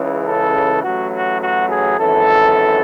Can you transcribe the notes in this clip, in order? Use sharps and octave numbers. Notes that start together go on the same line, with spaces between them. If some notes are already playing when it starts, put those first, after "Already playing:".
Already playing: C#2 C#3 E3
A4
A1 A2 F#3 F#4
F#4
F#4
G#4
G#1 F#2 E3 A4